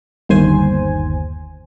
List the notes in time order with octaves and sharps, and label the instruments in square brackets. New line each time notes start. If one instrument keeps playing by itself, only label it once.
[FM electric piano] G1 D#2 C5 G#5